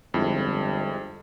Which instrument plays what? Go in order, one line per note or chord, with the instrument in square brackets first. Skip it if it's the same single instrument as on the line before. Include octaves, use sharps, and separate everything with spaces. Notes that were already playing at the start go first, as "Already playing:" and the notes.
[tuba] G1 [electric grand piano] F2 G#3 E4